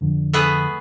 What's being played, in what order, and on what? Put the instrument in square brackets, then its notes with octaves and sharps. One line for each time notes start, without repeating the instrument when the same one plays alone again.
[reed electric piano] F2 D3 F3
[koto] A3 B3 G#4